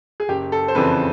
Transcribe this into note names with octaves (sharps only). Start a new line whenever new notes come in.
G#4
F#1 G4
A4
C5
F2 C#3 E3 B4